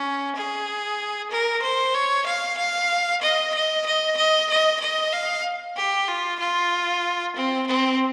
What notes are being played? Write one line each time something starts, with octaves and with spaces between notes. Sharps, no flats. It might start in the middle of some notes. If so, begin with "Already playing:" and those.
Already playing: C#4
G#4
A#4
C5
C#5
F5
F5
D#5
D#5
D#5
D#5
D#5
D#5
F5
G4
F4
F4
C4
C4